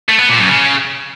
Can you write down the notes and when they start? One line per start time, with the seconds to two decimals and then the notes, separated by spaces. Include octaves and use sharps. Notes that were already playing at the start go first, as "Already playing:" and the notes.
0.09 A3
0.19 B3
0.29 A#2
0.39 F#2
0.49 C#3